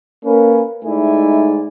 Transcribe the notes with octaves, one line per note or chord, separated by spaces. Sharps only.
A#3 C#4 B4
G#2 A3 D#4 E4 D5 G#5